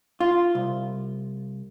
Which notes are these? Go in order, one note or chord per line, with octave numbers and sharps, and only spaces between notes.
F4
C2